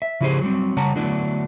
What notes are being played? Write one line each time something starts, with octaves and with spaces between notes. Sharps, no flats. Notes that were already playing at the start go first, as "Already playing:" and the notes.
E5
C#3 F3 E4 G4 G#4 C5
F#3 G3 C4
C#3 G3 C#5 F#5 A5 A#5
D3 F#3 A3 B3 D4 E4